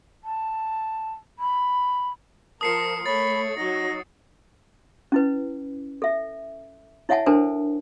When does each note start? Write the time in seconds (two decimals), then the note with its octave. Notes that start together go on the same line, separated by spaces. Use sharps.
0.24 A5
1.39 B5
2.61 F3 A#4 A5 D#6 C7 C#7
3.06 A3 C#5 B5 A6
3.57 F#3 D#4 A#6
5.12 C#4 E4 B4
6.02 A4 E5
7.09 E4 C#5 E5 F#5 G#5 A5
7.26 D4 A4 A#4 C5 G#5 A5